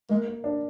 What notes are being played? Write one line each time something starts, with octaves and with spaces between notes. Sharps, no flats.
G#3 A#3
A#3
D4